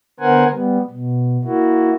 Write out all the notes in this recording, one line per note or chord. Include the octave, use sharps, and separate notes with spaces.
D3 B3 A#4 C5 F#5 G#5
G3 B3
B2
A#3 E4 F#4